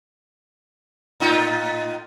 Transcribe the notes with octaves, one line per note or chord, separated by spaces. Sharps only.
A2 D#4 F4